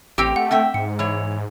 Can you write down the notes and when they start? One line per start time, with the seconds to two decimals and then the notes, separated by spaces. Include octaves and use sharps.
0.18 A1 C4 G4 G5 E6 D7
0.36 A3 F#5
0.51 C4 E5 G5
0.74 G#2 C#7
0.99 E3 C#5